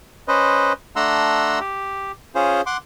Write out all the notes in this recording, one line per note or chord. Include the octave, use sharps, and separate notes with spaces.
C#4 B4 C5 D#5
A3 D4 F#5 A#5 C6 E6
G4
C#4 F4 G#4 C5
F#5 C6 D6